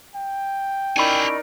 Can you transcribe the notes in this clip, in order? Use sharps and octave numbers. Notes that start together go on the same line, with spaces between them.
G5
C#4 D#4 E4 G4 A#4 D5 G#5 B5